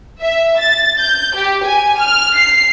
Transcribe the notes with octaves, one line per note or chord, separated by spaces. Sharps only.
E5
A6
G6
G4
G#5
F6
C7